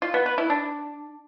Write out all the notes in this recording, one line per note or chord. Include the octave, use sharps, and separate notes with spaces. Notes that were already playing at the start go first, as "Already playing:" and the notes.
F4
B3
B4
E4
D4